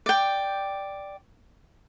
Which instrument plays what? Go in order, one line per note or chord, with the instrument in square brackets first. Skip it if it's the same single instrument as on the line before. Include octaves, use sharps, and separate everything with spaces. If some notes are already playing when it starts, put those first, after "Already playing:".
[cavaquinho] D5 G5